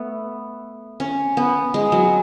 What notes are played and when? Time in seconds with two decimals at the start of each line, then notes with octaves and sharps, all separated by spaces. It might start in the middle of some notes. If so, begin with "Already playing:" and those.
Already playing: A3 B3
1.00 C#4
1.37 B3
1.74 G#3
1.92 F#3